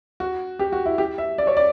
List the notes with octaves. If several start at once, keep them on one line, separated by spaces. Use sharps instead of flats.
F#4
G4
F#4
E4
G4
E5
D5
C#5
D5